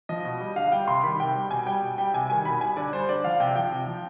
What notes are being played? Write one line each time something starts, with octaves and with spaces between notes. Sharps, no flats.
F3 D#5
B2
G3
D3 F5
G3 G5
C3 C6
D#3 G3 B5
C3 G5
G3
B2 G#5
G3 G5
B2
G3 G5
C3 G#5
D#3 G3 G#5
B2 B5
G3 G#5
D3 D5
G3 C5
D3 D5
F3 F5
C3 G5
F3 G5
C3
F3